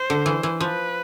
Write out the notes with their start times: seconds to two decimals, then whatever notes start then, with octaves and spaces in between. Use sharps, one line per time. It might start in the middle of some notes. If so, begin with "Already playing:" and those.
Already playing: C5
0.10 D3
0.26 E3
0.43 E3
0.60 F3 B4